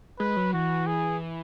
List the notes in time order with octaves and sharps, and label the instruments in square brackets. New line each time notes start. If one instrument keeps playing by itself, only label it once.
[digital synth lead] G#3 [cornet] B4
[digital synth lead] F#3
[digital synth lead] E3 [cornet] F#4
[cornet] G#4